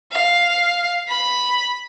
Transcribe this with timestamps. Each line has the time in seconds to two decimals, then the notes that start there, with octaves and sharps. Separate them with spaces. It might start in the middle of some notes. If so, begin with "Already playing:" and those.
0.12 F5
1.09 B5